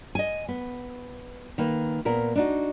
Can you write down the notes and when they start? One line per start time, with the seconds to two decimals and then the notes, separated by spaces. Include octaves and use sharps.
0.15 D#5 G#5
0.48 B3
1.58 D#3 A#3 B4
2.05 A#2 B3 A#4
2.36 D4 D#4 F#4